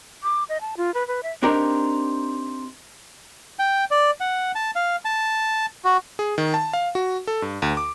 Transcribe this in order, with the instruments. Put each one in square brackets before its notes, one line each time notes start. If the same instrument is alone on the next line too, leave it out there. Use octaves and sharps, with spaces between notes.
[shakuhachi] D6
D#5
A5
F4
B4
B4
E5
[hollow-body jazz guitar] C4 D4 D#4 G4 A#4
[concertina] G5
D5
F#5
A5
F5
A5
F#4
[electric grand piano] G#4
D#3
A5
F5
F#4
A4
G2
D2
D6